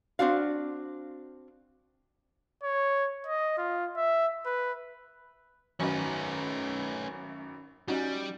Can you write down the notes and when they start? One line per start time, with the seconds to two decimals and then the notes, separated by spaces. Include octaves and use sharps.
0.19 C4 D4 F#4 F5
2.63 C#5
3.27 D#5
3.58 F4
3.97 E5
4.46 B4
5.80 G#1 F#2 F#3 C#4 D#4 B4
7.88 G3 C#4 D#4 F#4